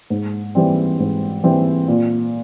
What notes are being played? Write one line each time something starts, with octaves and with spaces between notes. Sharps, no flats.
G#2
E3 G3 C4
G#2
E3 G3 C4
A#2